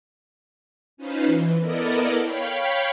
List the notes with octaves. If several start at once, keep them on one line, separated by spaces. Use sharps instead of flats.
C#4 D#4 F4 B4 C5
E3
B3 E4 A4 A#4 D5 D#5
C#5 F5 G5 B5